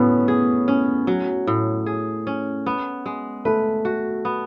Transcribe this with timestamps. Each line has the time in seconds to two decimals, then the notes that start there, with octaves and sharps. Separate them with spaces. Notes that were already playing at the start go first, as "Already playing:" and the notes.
Already playing: A2 F#3 B3 C#4
0.28 G#4
0.68 C#4
1.07 F#3
1.47 A2
1.86 G#4
2.27 C#4
2.66 B3
3.06 G#3
3.45 A3 B4
3.85 F#4
4.25 B3